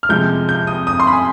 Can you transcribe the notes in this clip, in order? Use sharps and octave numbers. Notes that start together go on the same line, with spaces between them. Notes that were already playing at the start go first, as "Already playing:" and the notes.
F6
F2 C3 F3 G#3 G6
G6
D#6
D#6
C6
B5
G#5